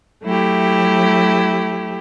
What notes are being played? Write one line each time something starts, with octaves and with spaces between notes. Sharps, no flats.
F#3 A3 E4 G4